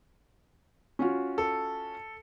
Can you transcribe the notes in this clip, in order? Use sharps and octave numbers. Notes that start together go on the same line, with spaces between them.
C#4 F4 F#4
A4